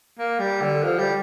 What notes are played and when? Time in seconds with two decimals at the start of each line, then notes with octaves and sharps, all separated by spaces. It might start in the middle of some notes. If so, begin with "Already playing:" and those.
0.18 A#3
0.39 G3
0.61 D3
0.83 F3
0.99 G3